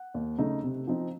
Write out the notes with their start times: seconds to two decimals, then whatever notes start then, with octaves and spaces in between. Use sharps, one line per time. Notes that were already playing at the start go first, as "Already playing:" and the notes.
Already playing: F#5
0.14 D#2
0.38 C#3 A3 D#4
0.64 C3
0.88 F3 C4 D#4